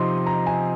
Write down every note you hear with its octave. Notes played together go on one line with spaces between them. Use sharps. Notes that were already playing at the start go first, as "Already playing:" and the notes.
Already playing: C3 F3 C4 D#4 C6
A#5
G#5